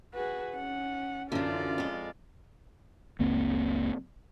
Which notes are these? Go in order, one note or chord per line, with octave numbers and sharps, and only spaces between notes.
F#4 G#4 B4
C#4 F#5
F#2 D3 E3 F4 D5
F2 G#3
F#1 C#2 A#3 C4